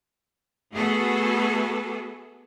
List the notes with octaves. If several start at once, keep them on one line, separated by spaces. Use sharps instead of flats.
A3 B3 F#4 G#4 A4